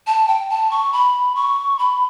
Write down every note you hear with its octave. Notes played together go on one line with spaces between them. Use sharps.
A5
G5
A5
C#6
B5
C#6
B5